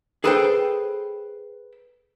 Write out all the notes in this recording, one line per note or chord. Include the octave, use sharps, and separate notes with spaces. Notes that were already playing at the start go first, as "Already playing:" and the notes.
G#4 A4 B4 C5 F5 G5